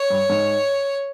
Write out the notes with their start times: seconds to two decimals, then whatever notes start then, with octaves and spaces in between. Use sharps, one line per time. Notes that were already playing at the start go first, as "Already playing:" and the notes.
Already playing: C#5
0.10 G2
0.30 G#2